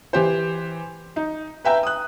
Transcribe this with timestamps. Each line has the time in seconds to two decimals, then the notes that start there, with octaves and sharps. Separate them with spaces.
0.13 E3 G4 C5
1.16 D#4
1.65 B4 E5 G5 A#5
1.83 D#6 F#6